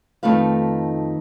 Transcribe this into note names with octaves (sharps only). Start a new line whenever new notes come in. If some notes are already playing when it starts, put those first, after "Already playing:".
F2 D#3 A3 D#4 B4 F5